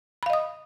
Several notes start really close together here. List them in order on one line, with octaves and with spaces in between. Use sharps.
B5 F5 D#5 D#6